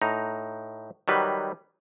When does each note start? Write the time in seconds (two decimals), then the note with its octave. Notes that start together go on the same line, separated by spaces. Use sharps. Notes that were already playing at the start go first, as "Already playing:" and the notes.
0.02 A2 D#4 A#5
1.08 D#3 F#3 G3 B4